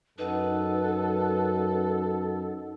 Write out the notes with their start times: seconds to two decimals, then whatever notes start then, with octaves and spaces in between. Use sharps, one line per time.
0.18 F#2 D#4 A4 B4 D#5 F#5